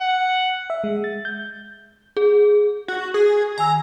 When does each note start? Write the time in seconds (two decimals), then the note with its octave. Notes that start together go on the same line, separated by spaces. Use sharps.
0.01 F#5
0.70 E5
0.84 G#3
1.04 A6
1.25 G6
2.17 G#4
2.88 F#4
3.14 G#4
3.58 D#3 G#5 A#5 E6